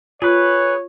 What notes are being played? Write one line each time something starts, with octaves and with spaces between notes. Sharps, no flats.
F4 G#4 B4 C#5